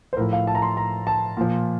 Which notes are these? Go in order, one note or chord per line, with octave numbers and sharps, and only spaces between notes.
C5
A2 F3 A#4
F5
A5
A#5
C6
A#5
A5
A#2 F3